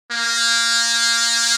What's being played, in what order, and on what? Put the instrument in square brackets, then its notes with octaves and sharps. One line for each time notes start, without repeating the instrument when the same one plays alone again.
[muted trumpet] A#3